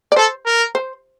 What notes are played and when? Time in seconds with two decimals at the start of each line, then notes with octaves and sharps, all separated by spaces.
0.12 D5
0.16 A4 C5
0.46 A#4
0.75 C5